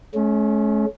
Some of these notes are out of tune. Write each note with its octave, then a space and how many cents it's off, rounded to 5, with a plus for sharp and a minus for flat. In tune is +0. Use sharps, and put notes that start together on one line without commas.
A3 -45 C#4 +0